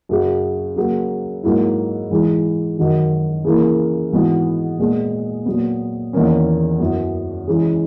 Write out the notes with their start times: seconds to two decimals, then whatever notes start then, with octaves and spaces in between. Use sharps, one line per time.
0.09 F#2 C#3 F#3
0.76 C#3 F#3 A#3
1.43 G#2 F#3 A#3 E4
2.10 G#2 E3 G#3
2.77 F#2 D#3 F#3
3.45 C#3 E3 A#3 E4
4.12 G#2 E3 B3 F#4
4.79 A#2 G#3 B3
5.46 A#2 F#3 B3
6.13 E2 D#3 A#3 C#4
6.80 F#2 E3 B3
7.47 C#3 E3 G#3